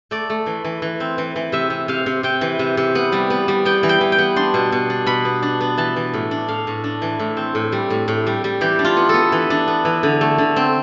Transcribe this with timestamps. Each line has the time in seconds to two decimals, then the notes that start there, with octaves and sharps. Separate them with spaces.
0.11 A3 D5
0.30 A3
0.46 E3
0.64 E3
0.82 E3
1.00 C4
1.18 E3
1.36 E3
1.52 C3 E5
1.70 C3
1.88 C3 F5
2.06 C3
2.23 C3 G5
2.41 E3
2.59 C3
2.77 C3
2.95 B3
3.12 G3
3.30 B3
3.48 G3
3.65 B3 G5
3.83 E3
3.89 G5
4.01 E3
4.12 G5
4.18 B3
4.36 D4 C6
4.54 B2
4.72 B2
4.90 D4
5.06 B2 B5
5.25 B3
5.42 D4
5.61 B3
5.77 E3 A5
5.96 E3
6.14 A2
6.31 D4
6.48 A2 F5
6.67 A2
6.84 D4
7.02 E3
7.19 A2
7.37 C4
7.55 A2
7.72 G3
7.90 A2
8.08 A2
8.27 G3
8.44 G3
8.61 E3 G4
8.79 D4
8.85 F4
8.97 B3
9.09 B3 A4
9.32 E3
9.50 D4
9.68 B3
9.85 E3
10.03 D3
10.21 A3
10.38 D3
10.56 C4